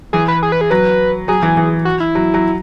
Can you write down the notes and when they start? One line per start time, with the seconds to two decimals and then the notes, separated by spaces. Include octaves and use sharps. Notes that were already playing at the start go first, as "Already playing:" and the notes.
0.13 E3 G#4
0.28 B4
0.43 G#4
0.52 B4
0.61 G#4
0.70 F#3 B4
1.28 F#3 G#4
1.43 E3
1.57 E3
1.85 F#4
2.00 E4
2.15 F#3
2.34 F#3